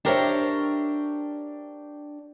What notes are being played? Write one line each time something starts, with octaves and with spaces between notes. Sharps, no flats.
D4 G4 A#4 C5 C#5 E5